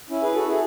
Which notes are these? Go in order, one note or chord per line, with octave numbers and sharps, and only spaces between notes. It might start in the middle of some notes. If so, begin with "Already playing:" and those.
C#4 E4
G#4 B4
F#4 A4
E4 G#4